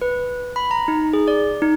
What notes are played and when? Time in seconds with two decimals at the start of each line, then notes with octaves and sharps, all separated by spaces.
0.02 B4
0.56 B5
0.71 A#5
0.88 D#4
1.13 G#4
1.28 D5
1.62 D#4